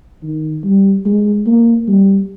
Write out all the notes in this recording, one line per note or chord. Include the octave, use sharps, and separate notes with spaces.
D#3
G3
G#3
A#3
G3